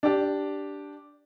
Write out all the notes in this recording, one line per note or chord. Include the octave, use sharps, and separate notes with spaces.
D4 G4